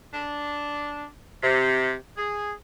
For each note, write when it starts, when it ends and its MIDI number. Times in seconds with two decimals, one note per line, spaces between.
0.14 1.07 62
1.43 1.94 48
2.18 2.53 68